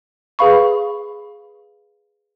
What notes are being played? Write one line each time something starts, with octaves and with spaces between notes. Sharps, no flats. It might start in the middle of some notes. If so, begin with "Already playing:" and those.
G#4 B4 F5 B5 C#6